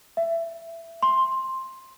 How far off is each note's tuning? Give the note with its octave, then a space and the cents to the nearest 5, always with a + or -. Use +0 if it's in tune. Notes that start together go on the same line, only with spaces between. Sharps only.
E5 +20
C6 +10